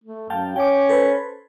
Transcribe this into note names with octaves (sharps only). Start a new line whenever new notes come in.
A3
F#2 F5 G5 A5
C#4 G5 D6
A4 B4 C5